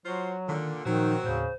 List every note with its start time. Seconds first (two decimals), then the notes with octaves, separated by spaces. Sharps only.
0.06 F#3 F4 F#4 C5
0.49 A#2 D3 D#3
0.86 A#2 D#3 F3 F#3 C4 D#4 F#4
1.24 D#2 A2 C#3 C5